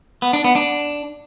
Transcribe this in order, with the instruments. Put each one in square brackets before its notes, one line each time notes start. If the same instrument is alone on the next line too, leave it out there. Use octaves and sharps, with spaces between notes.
[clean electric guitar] B3
D4
B3
D4